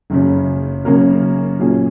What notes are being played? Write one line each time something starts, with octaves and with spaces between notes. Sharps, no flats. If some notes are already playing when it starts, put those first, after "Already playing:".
F#1 F#2 C#3
F#2 C#3 A#3 C#4 A#4
A#2 F#3 A#3 C#4 G#4